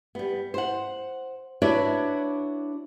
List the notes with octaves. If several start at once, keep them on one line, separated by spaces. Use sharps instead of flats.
G3 B3
C5 F#5
D4 E4 F#4 B4 C#5 D5